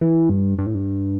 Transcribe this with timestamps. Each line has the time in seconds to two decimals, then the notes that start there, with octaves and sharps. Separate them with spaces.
0.01 E3
0.29 G2
0.59 G2
0.66 A2
0.75 G2